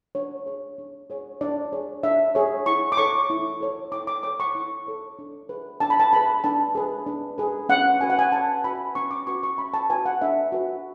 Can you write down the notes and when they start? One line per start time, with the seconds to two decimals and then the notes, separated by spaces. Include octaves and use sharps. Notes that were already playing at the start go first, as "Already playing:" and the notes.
0.15 D4 C#5
0.46 G#4 C#5
0.78 D4
1.10 G#4 C#5
1.41 D4 D5
1.72 G#4 C#5
2.03 D4 E5
2.35 G#4 C#5
2.66 E4 C#6
2.92 D6
2.97 A4 C#5 C#6
3.30 E4
3.61 A4 C#5
3.92 E4 D6
4.07 D6
4.23 A4 C#5 D6
4.40 C#6
4.55 E4
4.87 A4 C#5
5.19 D4
5.49 G#4 B4
5.80 D4 A5
5.90 B5
6.00 A5
6.13 G#4 B4 B5
6.44 D4 A5
6.75 G#4 B4
7.07 D4
7.38 G#4 B4
7.69 C#4 F#5
8.01 F#4 B4 G#5
8.10 F#5
8.19 G#5
8.32 C#4 A5
8.64 F#4 B4 B5
8.95 C#4 C#6
9.11 D6
9.27 F#4 B4 C#6
9.43 C#6
9.58 C#4 B5
9.74 A5
9.90 F#4 B4 G#5
10.06 F#5
10.22 D4 E5
10.52 F#4 B4